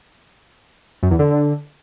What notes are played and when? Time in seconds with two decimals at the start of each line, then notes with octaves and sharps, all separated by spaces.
1.03 F#2
1.11 E2
1.19 D3